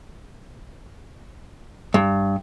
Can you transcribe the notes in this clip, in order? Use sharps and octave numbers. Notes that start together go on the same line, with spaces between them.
G2